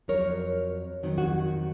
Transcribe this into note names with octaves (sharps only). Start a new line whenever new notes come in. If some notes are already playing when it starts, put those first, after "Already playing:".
F2 D#3 F#3 A#4 C#5
F2 D#3 F#3 C4
F#4